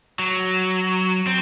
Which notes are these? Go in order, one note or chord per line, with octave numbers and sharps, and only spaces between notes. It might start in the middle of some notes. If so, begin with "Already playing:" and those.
F#3
C4